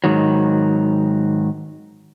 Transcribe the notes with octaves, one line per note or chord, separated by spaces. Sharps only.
G#2 D#3 F#3